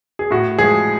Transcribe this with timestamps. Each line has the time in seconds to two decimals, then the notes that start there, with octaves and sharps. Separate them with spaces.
0.19 G#4
0.31 A2 F#4
0.59 F3 G#3 G#4